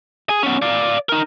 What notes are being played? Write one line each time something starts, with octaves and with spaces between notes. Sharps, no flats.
G#4 G#5
B3 C#4
D5 F5
D#4 A#4